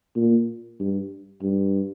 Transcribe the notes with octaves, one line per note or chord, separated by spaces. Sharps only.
A#2
G2
G2